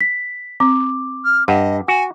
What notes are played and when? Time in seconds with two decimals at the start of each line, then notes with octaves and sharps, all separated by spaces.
0.01 B6
0.60 C4 D6
1.25 F6
1.48 G2 D#5 F#5
1.88 F#4 G#5